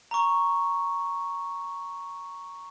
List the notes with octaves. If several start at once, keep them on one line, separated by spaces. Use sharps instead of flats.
A#5 C#6